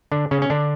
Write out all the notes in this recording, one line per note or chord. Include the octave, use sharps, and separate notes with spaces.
D3 D4
C#3 C#4
C#4
D3 D4